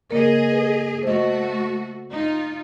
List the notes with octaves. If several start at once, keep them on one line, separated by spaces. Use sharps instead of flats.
C#3 A#3 G#4 A#4 D#5
A4 B4
A3 F#4 C5 D#5
D#4 F4